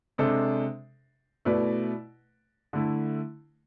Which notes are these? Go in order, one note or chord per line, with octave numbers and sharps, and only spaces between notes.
C3 G#3 D4 A4 C5
B2 A3 E4 B4 D5
D3 A3 E4